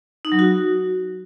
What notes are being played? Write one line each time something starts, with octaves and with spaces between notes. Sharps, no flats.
D#4
F#3
F#4